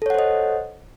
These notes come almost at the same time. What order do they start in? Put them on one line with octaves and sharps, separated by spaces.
A4 C#5 F#5 C5 D#5